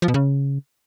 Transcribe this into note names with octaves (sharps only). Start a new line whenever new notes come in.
F3
B2
C#3